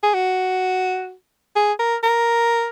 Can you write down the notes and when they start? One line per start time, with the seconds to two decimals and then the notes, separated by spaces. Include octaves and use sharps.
0.03 G#4
0.14 F#4
1.56 G#4
1.79 A#4
2.03 A#4